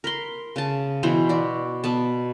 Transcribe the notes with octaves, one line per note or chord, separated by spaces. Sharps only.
A#4 B5 C6
C#3 A5
B2 E3 B3 C5
F#4 D5
B2 B3 A5